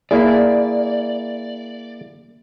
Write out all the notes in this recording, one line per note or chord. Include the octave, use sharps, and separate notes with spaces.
A#3 E4 G#4 D5